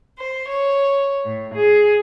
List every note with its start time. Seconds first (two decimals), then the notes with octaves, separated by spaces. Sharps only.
0.18 C5
0.47 C#5
1.24 A2
1.54 G#4